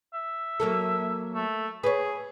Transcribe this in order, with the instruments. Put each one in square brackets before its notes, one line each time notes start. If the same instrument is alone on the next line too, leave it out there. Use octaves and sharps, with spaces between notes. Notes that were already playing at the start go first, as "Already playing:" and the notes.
[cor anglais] E5
[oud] F#3 A#3 A4
[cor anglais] A3
[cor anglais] G#4 [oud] B4 C#5